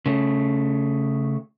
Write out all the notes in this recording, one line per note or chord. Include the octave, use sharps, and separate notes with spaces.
C#3 A3